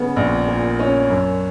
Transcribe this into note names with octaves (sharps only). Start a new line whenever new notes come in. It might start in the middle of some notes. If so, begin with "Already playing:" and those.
Already playing: C#3 B3
A#1
A#2
C#4
F#2